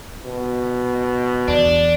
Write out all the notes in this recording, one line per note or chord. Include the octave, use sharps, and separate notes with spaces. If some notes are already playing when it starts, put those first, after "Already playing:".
B2
E2 D4